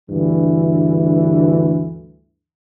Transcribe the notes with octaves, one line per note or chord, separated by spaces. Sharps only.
D2 G2 E3